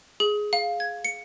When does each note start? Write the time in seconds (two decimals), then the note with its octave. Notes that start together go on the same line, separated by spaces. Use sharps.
0.20 G#4
0.53 F5
0.80 G#6
1.05 C#7